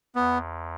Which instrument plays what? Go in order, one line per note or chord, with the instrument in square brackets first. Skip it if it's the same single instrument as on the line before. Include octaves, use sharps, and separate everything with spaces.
[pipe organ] E2 [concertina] B3